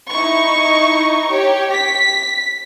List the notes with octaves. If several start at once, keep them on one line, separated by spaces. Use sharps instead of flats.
D#4 E4 C#6
G4 C#5
B6